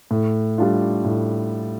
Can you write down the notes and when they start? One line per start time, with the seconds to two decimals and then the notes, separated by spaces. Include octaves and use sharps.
0.11 A2
0.58 G3 D4 F4
1.05 A2